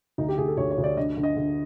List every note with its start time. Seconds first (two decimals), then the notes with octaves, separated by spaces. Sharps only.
0.18 D2 D#4
0.28 G4
0.38 D2 G#4
0.48 A4
0.57 D2 C#5
0.71 C#5
0.78 D2
0.84 D5
0.97 D3 D#5
1.17 D3
1.23 D#5
1.37 D3